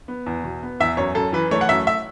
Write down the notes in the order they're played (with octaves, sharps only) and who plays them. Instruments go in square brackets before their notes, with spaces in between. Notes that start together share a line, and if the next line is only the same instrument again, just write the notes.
[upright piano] B3
E2
B2
B3
E2 E5
F#2 C#5
F#2 A4
E3 B4
A3 C#5
F#5
F#2 E5
E5